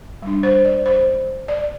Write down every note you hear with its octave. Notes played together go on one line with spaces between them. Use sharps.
G3 D4
C5
D5
C5
D5